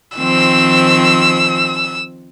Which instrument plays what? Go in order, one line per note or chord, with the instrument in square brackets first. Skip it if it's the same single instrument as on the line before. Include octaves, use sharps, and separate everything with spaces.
[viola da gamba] D#3 F3 C4 [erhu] E6